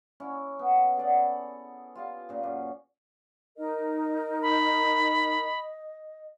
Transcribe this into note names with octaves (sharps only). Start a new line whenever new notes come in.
C#4 E4
B3
G#4 A4 D5 F#5
F4 G4 F5
A#2 C#3
F#2
D#4 A#4 D#5
B5